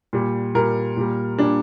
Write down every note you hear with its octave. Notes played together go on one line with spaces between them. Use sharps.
A#2 G3
A#2 G3 A#4
A#2 G3
A#2 G3 D4